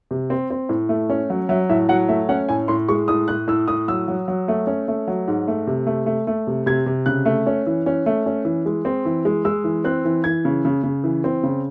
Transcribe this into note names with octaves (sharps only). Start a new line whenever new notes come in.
C3
C4
C4
A2
A3
C#4
F#3
F#3 E5
A2 E5
F#3 F#5
A3 E5
C#4 F#5
A2 G#5
A2 C6
G#3 C#6
A2 D#6
A2 F#6
A2 E6
A2 D#6
F#3 E6
F#3
F#3
A3
C#4
A3
F#3
G#2
A3
C3
A3
A3
A3
C3
C3 G#6
C3
C#3 F#6
A3
C#4
E3
C#4
A3
C#4
E3
G#3
C4
E3
G#3
G#3 E6
E3
C4 F#6
E3
E3 G#6
C#3
C#3
C#3
E3
C4
C#3